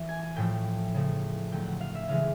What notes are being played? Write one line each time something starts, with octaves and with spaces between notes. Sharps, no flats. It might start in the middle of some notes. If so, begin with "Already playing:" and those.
Already playing: E3
G#5
G#5
A2 F3 A3 G5
C#3 F3 A3
D3 F#3 A3 G5
F#5
F5
E5
C#3 E3 G#3 F5